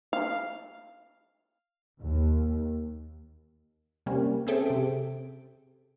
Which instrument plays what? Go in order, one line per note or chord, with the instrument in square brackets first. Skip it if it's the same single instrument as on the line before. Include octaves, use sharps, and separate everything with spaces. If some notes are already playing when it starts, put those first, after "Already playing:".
[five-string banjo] F5
[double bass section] D#2
[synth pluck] C3 G3 A#3 C#4
C4 C#4 G#4 A4 E5 G5
C3 D7